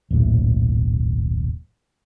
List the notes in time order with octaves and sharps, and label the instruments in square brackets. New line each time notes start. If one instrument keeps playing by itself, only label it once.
[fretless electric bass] D#1 B1 A2